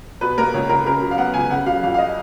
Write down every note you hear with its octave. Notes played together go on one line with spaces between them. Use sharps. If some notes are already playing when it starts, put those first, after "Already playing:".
B2 B4
A#3 A#4
C#2 C#5
C#2 A#4
C#3 A#4
F#3
F5
B3 F#5
C#2 G#5
C#3 F#5
F#3 F5
F2 F5
F5
D#5